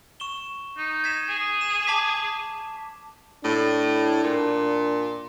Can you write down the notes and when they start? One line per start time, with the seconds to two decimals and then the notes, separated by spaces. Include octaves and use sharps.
0.20 C#6 E7 G7
0.77 D#4
1.04 G#6 B6 E7
1.29 G#4
1.61 E7
1.87 A5 D6 B6
3.44 A2 D4
4.24 A#2